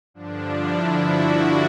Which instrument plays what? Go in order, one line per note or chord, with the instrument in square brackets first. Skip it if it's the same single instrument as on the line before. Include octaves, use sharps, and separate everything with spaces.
[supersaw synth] G2 D3 F3 D4
E4
F#4